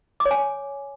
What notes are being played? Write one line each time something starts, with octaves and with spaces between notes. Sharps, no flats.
D6
C#5
G#5